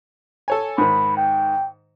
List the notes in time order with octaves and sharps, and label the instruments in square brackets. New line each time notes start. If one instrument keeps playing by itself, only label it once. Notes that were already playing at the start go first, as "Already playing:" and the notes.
[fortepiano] A4 C#5 G#5
[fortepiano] G#2 D#3 [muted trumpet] B5
[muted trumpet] G5